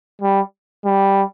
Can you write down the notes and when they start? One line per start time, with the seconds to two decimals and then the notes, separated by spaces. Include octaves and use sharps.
0.22 G3
0.85 G3